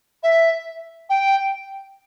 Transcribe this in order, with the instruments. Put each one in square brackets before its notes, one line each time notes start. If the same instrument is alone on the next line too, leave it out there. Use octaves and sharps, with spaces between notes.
[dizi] E5
G5